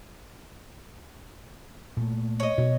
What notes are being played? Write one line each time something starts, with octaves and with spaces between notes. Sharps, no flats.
A#2 A3
C#5 D#5
B2